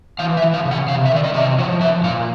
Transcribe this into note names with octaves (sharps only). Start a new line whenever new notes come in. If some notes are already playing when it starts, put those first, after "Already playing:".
E3 F5
E5
E3
F5
C#3
F#5
C3 F5
E5
D#3 D5
D#5
C3 E5
D#5
F3 C#5
F3 E5
A#2 F5